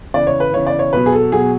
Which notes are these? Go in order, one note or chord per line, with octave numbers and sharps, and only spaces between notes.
C#3 E3 D5
C#5
B4
C#3 E3 C#5
D5
C#5
B2 F#3 B4
G#4
A4
B2 F#3 G#4